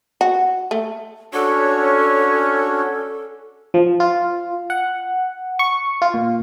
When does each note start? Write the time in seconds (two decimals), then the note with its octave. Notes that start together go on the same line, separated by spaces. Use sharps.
0.21 F#4
0.71 A3
1.33 C#4 D4 F#4 A4 C#5
3.74 F3
4.00 F4
4.70 F#5
5.59 C#6
6.02 F4
6.14 A#2